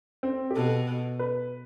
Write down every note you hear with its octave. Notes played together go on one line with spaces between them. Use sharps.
C4
G4
B2 A4
B4